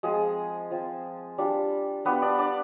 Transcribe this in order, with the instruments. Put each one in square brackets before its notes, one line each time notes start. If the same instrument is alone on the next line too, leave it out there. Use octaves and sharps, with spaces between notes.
[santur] F3 G#3 C4 F4 G#4
F3 C4 F4
G3 D4 F4
G3 B3 D4 F4 B4
D4 D5
D4 D5